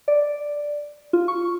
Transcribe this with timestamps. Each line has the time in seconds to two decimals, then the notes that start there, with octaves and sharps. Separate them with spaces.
0.08 D5
1.13 F4
1.28 C#6